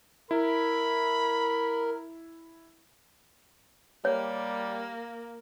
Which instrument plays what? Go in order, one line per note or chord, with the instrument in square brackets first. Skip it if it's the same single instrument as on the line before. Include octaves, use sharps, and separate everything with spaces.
[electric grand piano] E4 [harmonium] A#4 [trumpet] B5
[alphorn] G3 [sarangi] A#3 [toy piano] C#5